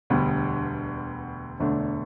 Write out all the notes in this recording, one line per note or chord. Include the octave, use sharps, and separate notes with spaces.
E1 D2 D3 G3 B3
E1 D2 D3 A3 D4